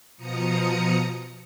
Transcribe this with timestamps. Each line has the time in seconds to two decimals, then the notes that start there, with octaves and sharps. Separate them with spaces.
0.16 B2 F3 A#5 D#6 C#7